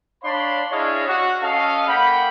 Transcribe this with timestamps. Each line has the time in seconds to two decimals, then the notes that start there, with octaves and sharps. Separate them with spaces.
0.23 D4 C#5 D5 F5 B5 C6
0.71 D4 E4 G#4 C#5 D#5 F5
1.08 F#4
1.43 C#4 A4 D#5 F5
1.87 A#3 F#5 G5 B5